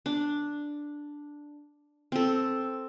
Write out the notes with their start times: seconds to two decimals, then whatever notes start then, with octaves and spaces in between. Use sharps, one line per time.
0.06 D4
2.12 C4 A4